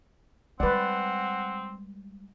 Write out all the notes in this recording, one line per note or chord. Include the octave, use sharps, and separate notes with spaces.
G3 G#3 C4 B4 D5 F#5